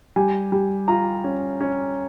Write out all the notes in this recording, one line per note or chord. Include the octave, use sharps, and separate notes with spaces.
G3 G#5
G3
F4 A#5
C#4
C#4